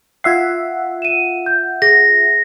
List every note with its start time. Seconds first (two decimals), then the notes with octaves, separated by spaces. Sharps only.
0.24 F4 E5 F#5 G#6 C7
1.02 D#7 E7
1.46 G6
1.82 G#4 A#6